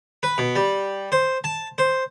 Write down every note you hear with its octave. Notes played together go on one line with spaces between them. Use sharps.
B4
B2
G3
C5
A5
C5